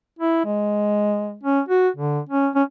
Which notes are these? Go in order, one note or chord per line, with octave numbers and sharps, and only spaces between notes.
E4
G#3
C#4
F#4
D3
C#4
C#4